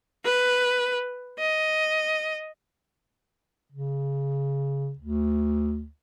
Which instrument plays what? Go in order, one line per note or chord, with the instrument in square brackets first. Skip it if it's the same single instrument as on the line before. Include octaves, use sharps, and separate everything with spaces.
[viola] B4
D#5
[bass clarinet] C#3
D2